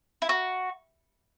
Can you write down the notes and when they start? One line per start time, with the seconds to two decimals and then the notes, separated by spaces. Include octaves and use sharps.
0.22 E4
0.29 F#4